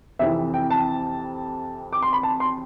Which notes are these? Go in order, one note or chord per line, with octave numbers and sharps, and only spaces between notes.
F2 C3 E3 E5
G5
A5
D6
C6
B5
A5
C6